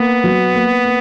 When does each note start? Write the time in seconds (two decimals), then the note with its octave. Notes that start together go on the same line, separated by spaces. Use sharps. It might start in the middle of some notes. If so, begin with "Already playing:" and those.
Already playing: A#3 B3
0.24 F#3
0.55 A#3
0.85 A#3